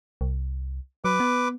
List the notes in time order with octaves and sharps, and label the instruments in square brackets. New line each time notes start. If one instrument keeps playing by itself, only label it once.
[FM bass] C2
[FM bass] F#3 [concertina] B4 D6
[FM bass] B3